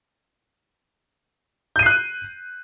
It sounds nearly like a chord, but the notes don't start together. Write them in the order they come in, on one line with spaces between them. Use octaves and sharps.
G6 D#7 C7 F#6